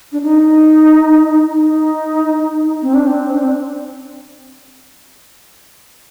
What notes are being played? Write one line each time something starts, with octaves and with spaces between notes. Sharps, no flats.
D4
D#4
D#4
C4
D4
C4
D4
C4